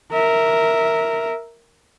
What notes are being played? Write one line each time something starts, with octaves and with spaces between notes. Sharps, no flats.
A#4 E5